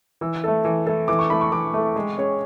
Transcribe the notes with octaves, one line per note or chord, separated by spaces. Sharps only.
E3 E6
A3 E4 A4
E3
A3 E4 A4
E3 D6
C#6
A3 E4 A4 B5
C#6
E3 D6
A3 E4 A4
G#3
C#4 G#4 C#5